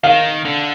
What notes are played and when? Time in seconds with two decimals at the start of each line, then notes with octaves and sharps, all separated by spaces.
0.03 D#3 F5
0.45 D3